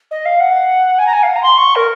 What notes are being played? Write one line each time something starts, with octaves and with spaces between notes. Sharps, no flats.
D#5
F5
F#5
G#5
A#5
G#5
F5
F#5
A#5
C6
C#6
A#4